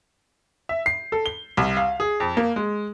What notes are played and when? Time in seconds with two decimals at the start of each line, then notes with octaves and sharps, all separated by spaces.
0.69 E5
0.86 C7
1.12 A4
1.26 G7
1.57 C2
1.77 F5
2.00 G#4
2.20 F2
2.37 A#3
2.56 G#3